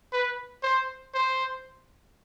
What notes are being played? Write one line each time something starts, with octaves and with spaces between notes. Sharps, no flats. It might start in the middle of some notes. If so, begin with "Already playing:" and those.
B4
C5
C5